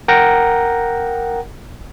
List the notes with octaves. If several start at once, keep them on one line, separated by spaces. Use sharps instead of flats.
A#4 F#5 G5 A#5 A#6